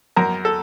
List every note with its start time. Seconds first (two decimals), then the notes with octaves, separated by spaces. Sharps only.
0.16 F#2 A#4
0.45 A4